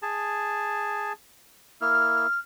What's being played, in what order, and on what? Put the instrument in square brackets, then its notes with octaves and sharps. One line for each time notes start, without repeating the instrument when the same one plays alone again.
[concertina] G#4 A5
[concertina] A#3 E4 [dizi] F6